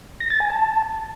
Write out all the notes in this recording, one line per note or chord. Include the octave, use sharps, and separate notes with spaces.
A#6
A6
G#5
A5